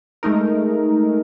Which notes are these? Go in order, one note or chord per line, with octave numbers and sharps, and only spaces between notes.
G#3 A3 D#4 A#4